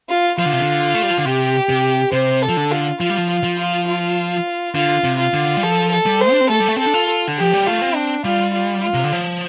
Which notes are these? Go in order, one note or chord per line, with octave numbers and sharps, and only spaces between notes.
F4
F3 F4
D3
C3
D3
A3
G3
F3
D3
C3 G4
C3
C3 C5
A4
F3
D3
F4
F3 F4
G3
F3
F4
F3
F4
F4
D3 F4
C3
F4
D3
G3
F3 A4
A4
G3
C5
D4
C4
A3 A4
G3
A3
C4 A4
D4
F4
D3
F3 G4
G3
A3 F4
C4
D4
G3 F4
F4
F4
C3
D3
F3